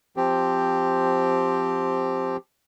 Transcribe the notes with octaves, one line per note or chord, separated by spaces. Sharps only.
F3 C4 G4